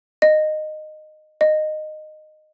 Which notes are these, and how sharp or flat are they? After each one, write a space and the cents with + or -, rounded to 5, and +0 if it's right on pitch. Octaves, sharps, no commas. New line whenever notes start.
D#5 -15
D#5 -15